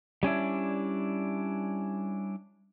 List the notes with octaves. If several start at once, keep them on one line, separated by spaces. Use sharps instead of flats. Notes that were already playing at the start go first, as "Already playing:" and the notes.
G3 C#4 D4 E4